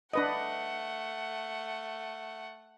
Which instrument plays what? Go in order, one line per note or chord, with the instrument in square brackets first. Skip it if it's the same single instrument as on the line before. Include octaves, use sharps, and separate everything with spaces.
[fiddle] A3 F#5 [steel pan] D4 B4 D#5